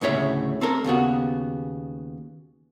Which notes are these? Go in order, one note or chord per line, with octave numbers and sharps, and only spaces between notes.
D2 A2 C#3 C#5 E5
C4 A4 A#4
D#2 C#3 B3 F#4